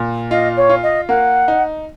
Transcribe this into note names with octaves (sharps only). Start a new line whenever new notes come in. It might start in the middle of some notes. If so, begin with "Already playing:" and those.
Already playing: A#2
F4 D#5
C#5
F4
D#5
A#3 F#5
D#4